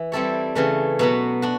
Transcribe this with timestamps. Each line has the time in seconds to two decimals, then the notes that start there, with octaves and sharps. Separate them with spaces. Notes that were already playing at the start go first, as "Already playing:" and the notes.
Already playing: E3
0.12 G3 C4 E4 A4 C#5
0.55 C#3 E3 A3
0.99 B2 F#3 B3
1.42 D4 F#4